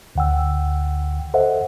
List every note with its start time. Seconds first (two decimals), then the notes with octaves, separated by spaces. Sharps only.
0.15 D2 D3 F#5 G5 E6
1.34 A4 C5 D#5 E5 F#5